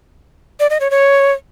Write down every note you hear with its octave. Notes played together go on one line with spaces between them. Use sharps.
D5
D#5
C#5
C#5